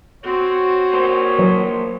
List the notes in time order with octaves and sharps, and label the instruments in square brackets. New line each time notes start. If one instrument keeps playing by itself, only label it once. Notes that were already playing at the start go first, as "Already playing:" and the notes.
[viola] C4 F#4 [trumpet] C#5
[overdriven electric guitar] A#3 C5
[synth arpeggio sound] E3 F#3